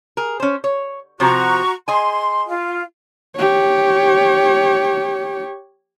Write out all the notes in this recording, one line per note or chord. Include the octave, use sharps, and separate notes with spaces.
G#4 A#4
C#4 C5
C#5
C3 F3 C4 F#4 A#5 C#6
G#4 D#5 G#5 C6
F4
G4 C#5